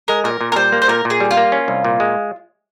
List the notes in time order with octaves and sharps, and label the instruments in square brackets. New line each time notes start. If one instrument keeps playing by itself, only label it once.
[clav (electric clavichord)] G#3 [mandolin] A#4
[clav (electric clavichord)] A#2 [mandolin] A#4
[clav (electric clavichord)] A#2
[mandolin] A#4
[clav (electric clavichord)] G3 [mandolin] C5
[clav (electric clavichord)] A#3
[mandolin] C5
[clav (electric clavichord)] A#2 [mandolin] A#4
[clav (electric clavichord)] A#2
[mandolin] G#4
[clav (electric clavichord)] G3
[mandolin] F4
[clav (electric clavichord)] A#3
C#4
C2
A#2
G#3